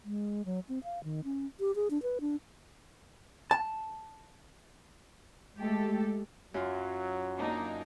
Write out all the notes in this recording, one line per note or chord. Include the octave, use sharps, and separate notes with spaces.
G#3
F#3
C4
F5
D#3
C#4
G4
G#4
D4
B4
D4
A5
G#3 A3 G4 A4
F#2 F#3 F4
A#3 D4 D#4